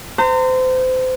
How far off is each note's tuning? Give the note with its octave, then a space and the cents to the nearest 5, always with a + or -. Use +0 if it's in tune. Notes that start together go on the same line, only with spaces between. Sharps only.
C5 -30 A#5 -35